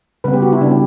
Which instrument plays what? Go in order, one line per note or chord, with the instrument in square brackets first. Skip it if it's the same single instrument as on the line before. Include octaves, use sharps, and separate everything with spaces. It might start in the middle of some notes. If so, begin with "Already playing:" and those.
[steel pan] C#3 G3 B3 B4
G4
F#4
E4
C#3 G3 B3 D4
G4